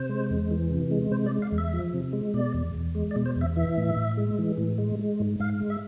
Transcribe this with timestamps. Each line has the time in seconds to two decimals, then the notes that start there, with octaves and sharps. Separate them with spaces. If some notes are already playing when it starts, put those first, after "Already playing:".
Already playing: C3 C5
0.09 G#3
0.30 E2
0.51 E3
0.71 C3
0.91 G#3
1.11 C3 C5
1.26 D5
1.32 G#3
1.42 F5
1.52 E2
1.58 E5
1.73 F3
1.94 C3
2.13 G#3
2.34 B2 D5
2.54 E2
2.75 E2
2.95 G#3
3.11 D5
3.16 B2
3.26 C5
3.36 E2
3.41 E5
3.56 E3 E5
3.77 A2
3.96 A2
4.17 G#3
4.38 E3
4.58 A2
4.78 G#3
4.99 G#3
5.20 G#2
5.40 G#2 F5
5.60 G#3
5.70 E5